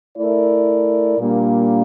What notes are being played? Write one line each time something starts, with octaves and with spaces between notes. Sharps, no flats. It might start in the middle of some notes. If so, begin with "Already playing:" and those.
A3 E4 A#4 D5
A#2 G3 A#3 D4